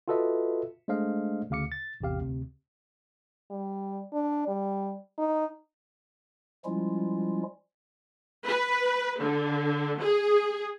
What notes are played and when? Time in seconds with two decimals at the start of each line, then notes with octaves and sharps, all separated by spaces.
0.08 F4 F#4 A4 B4 D#5 E5
0.88 G#3 A3 D4 C5 D#5 F5
1.50 D2 C#3 F5 D6 C#7
1.72 A6
2.01 A1 E2 C3 G4 F5
2.20 D2 C3
3.50 G3
4.13 D4
4.48 G3
5.18 D#4
6.65 F3 G3 G#3 C#4 E4 F4
8.47 B4
9.20 D3
10.01 G#4